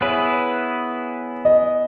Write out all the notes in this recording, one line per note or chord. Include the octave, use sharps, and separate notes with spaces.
B3 E4 G#4 B4 C#5
D#5